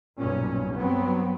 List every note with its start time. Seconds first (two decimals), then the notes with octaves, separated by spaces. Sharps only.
0.18 B1 G2 A#2 C#4
0.77 G2 F#3 B3 C4